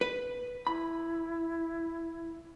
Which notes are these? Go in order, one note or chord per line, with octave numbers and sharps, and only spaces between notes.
B4
E4 B5